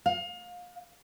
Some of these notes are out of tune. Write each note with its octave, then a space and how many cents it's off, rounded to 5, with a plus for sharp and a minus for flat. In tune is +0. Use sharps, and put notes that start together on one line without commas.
F5 +30